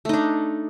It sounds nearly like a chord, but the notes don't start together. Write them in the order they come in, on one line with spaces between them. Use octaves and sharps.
A3 D#4 D4